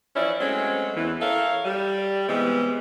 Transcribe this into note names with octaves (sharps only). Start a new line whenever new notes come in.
E3 F3 C#4 E4 D5
F#3 G#3 A3 C4 C#4
E2 E3
A4 A#4 C#5 E5 F5
G3
C3 E3 G3 G#3 B3